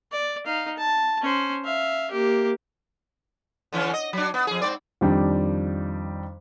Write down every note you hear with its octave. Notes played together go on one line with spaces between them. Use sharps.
D5
D#4 F5
A5
C#4 C5
E5 F5
A#3 G4
D3 E3 C#4
D#5
F#3 D4
B3
F2 G#4
G#2 C4 D5
F2 D#3 G3 D4 G5